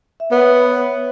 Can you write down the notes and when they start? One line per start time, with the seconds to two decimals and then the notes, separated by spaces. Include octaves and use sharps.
0.20 E5
0.31 B3 C#5